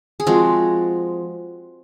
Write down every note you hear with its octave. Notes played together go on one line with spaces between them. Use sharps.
G#4
F3 G#3 C4 F#4